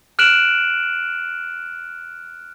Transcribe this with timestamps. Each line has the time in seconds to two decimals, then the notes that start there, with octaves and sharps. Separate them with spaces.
0.19 F6 F#6 D7 E7 F#7